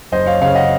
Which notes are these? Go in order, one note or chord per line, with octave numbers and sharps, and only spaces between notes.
F#1 C5 D#5
C#5 F5
C#3 C#5 F5
D#5 F#5